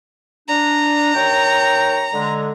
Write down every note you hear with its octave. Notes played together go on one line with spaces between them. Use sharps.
D4 A#5
D#2 C#5 G5
D3 G#3